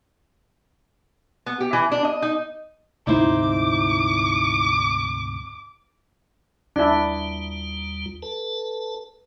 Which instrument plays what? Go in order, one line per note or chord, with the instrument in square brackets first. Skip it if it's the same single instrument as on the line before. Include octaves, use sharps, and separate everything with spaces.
[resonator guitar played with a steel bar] B3
G4
E3
D4
D#5
D#4
[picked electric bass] D2 G#2 C3 [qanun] D#4 E4 C5 [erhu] D6
[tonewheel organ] D#2 G3 F4 [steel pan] D4 E4
[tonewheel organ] A4 B4 A5